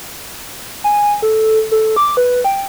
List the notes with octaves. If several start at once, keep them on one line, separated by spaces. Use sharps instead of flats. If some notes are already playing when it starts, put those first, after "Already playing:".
G#5
A4
A4
D6
B4
G5